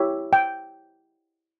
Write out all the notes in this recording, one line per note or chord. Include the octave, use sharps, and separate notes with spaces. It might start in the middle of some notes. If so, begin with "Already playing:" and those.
Already playing: E4 G4 C#5 E5
G5